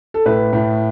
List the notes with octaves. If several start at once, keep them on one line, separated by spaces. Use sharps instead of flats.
A4
A2 B4
A2